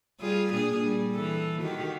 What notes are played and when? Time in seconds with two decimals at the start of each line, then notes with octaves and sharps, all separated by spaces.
0.20 G3 F4 G#4
0.53 A#2 D4 G#4
0.83 G3
1.12 E3 A4
1.61 D#3 F#4 G4